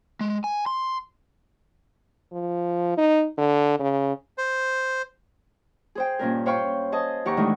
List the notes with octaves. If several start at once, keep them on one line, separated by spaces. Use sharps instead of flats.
G#3
G#5
C6
F3
D#4
D3
C#3
C5
G#4 C5 G5
G2 A#2 C#4 A#4
C5 C#5 F5 G5 B5 C#6
G#4 C5 D#5 A5
D#2 G4 F#5 A#5 C#6
A2 D#3 E3 G#3 D4